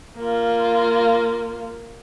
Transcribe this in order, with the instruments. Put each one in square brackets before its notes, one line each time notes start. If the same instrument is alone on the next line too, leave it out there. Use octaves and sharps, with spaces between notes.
[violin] A#3 F4